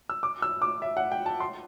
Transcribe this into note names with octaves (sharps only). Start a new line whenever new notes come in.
E6
D6
E6
D6
E5
F#5
G5
A5
C6